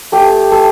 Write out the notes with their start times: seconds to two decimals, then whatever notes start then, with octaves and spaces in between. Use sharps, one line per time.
0.12 A3 G4
0.52 A3